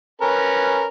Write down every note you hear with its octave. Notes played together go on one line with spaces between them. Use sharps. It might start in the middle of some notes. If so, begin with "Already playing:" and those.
C#4 A#4 B4